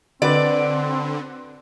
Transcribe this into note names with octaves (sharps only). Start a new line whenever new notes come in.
D3 C4 F#4 B4 D5